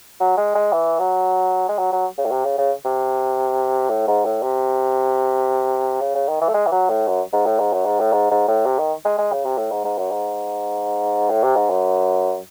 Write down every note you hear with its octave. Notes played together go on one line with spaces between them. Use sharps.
F#3
G#3
G#3
E3
F#3
G#3
F#3
F#3
C#3
A2
C3
C#3
C#3
C3
A2
G#2
A2
C3
C#3
C#3
D#3
E3
A3
G#3
E3
F#3
A2
F#2
G#2
A2
G#2
F#2
G#2
A2
G#2
G#2
A2
C3
D#3
G#3
G#3
C#3
C3
A2
G#2
G#2
F#2
G#2
A2
C3
G#2
F#2